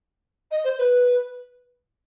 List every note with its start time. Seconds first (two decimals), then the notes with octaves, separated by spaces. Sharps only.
0.51 D#5
0.64 C5
0.78 B4